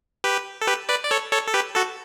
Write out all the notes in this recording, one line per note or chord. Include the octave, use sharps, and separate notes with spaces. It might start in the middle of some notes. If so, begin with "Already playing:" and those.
G4 B4
A4
G4 B4
B4 D5
D5
A4 C#5
A4 C#5
A4
G4 B4
F#4 A4